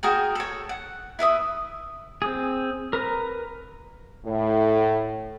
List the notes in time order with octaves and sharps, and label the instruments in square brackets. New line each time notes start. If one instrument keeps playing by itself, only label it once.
[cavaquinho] F#4 G#4 A#4 G5
A4 C#5
F#5
E4 B4 E5 D#6
[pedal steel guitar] C4 G#4
A#4 B4 A#5
[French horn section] A2